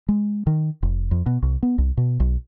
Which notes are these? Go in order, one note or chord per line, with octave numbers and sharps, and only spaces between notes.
G#3
D#3
F1
F2
B2
C2
B3
C2
B2
B1